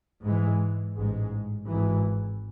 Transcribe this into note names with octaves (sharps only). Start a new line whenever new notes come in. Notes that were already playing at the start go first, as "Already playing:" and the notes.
G#2 E3 G#3
A1 G#2 G#3
G#1 G#2 E3